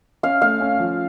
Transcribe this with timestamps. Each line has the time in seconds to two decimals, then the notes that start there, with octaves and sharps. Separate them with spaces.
0.23 C#4 F5
0.42 A3 F5
0.61 C#4
0.79 F3